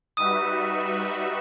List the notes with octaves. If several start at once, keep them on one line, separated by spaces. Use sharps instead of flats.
G3 D#4 F#4 B4 E5 D#6 D#7